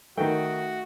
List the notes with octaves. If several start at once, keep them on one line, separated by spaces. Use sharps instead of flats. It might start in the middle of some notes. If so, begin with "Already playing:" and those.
D#3 A3 D#4 F#4 G5